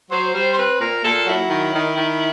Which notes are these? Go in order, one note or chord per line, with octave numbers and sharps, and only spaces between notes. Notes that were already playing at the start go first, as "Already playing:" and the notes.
F#3 C5
G3 C5
C5
C4 B4
A#2 A#4
A#2 A4
F#3 E4
D#3
D#3
D#3